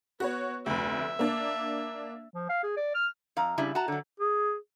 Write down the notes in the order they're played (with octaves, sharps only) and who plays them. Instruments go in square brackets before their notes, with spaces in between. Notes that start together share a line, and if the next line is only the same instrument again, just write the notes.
[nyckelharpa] B3 [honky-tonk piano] F#4 C#5
[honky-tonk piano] F1 D2 [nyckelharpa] E5
[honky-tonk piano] A#3 D4
[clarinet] F3
F5
G#4
D5
F6
[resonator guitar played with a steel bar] F2 F5 A#5
C#3 G3 D4 E4
F#4 A5 A#5
D3 F#3
[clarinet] G#4